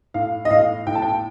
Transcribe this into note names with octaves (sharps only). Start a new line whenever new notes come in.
A2 F5
D#5
A2 F5
A2 G5
A5
G5